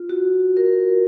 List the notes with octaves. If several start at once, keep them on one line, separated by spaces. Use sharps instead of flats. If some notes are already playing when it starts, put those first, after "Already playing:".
Already playing: F4
F#4
A#4